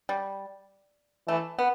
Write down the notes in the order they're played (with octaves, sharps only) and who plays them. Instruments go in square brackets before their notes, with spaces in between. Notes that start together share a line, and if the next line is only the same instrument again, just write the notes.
[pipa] G3
[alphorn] E3 [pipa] A3
[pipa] B3